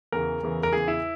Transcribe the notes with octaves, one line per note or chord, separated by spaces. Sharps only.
E2 C#3 E3 A#4
E2 C#3 E3
A#4
E2 C#3 E3 G#4
E4